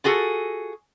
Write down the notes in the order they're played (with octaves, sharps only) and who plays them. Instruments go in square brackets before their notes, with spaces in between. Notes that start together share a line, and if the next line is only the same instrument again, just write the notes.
[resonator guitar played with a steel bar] F4 F#4 G#4 A4